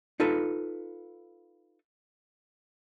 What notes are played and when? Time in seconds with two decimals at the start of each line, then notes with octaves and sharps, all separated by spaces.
0.20 D#4 F4 A4 B4